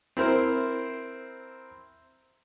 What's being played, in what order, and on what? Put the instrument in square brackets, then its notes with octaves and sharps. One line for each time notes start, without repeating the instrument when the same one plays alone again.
[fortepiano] C4 E4 A#4 C5